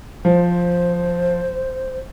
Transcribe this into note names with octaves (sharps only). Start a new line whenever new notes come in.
F3 C5